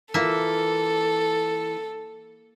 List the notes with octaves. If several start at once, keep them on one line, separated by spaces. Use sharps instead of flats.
E3 A#3 F4 A4 E5